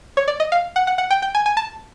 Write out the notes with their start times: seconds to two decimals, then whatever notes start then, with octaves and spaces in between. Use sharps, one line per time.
0.17 C#5
0.28 D5
0.40 D#5
0.52 F5
0.76 F#5
0.87 F#5
0.98 F#5
1.11 G5
1.22 G5
1.35 G#5
1.46 G#5
1.57 A5